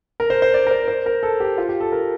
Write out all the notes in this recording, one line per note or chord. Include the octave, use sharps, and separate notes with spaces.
A#4
C5
C5
D5
A#4
C5
C5
A#4
A4
G4
F4
G4
A4
A#4